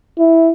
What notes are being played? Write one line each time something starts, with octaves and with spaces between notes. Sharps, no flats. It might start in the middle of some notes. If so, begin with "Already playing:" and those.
E4